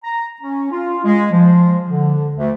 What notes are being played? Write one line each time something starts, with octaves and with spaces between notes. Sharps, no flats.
A#5
C#4
F4
G#3
F3
D3
D2